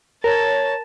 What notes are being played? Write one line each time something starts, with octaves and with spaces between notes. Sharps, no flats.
A#4 C#5 A5